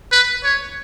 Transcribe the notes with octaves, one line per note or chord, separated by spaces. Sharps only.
B4
C#5